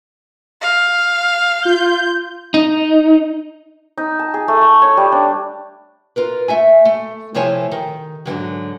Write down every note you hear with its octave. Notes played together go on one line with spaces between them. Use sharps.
F5
F4 G6
D#4
D#4
A5
G#4
A3
A3
C#5
G3
D4
F4 A#4 B4
A3 E5 G#5
A3
C3 F3 A3 E4 C#5 G#5
D#3
G#2 D3 D#3 F#3